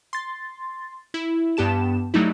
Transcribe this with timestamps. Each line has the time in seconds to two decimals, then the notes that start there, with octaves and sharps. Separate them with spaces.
0.13 C6 A6
1.14 E4
1.57 G2 B3 G4 A5 E7
2.14 F#3 G3 A3 D#4 E4